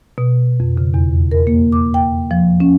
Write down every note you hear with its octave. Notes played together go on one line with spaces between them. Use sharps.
B2
F2
C#3
E2
A#4
A#3
D6
G5
F3
C#4